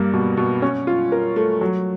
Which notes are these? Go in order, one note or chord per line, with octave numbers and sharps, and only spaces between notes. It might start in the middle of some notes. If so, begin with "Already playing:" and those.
Already playing: G2 G3 A#3
B2
B2
C#4
F4
A#4
A3
F#3